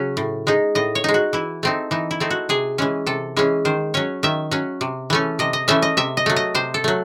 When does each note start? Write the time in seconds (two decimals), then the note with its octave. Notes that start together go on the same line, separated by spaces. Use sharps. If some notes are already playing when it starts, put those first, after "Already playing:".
Already playing: C#3 F#3 C#4
0.17 A2
0.47 G#3 D#4
0.75 A2 D#5
0.95 C#5
1.04 G#3 D#4
1.14 F#4
1.33 E3 E4
1.63 A3 C4 D#4
1.91 E3 D#4
2.11 E4
2.20 A3 C4 D#4
2.30 F#4
2.49 C3 G#4
2.78 E3 G#3 C#4
3.06 C3 A4
3.37 E3 G#3 C#4
3.65 D#3 C5
3.94 F#3 C#4 C#5
4.23 D#3 E5
4.51 F#3 C#4
4.81 C3
5.10 E3 A3 C#4
5.39 C3 D#5
5.53 D#5
5.68 E3 A3 C#4 E5
5.82 D#5
5.97 C3 E5
6.17 D#5
6.26 F#3 A3
6.36 D#5
6.55 C3 C5
6.74 A4
6.84 F#3 A3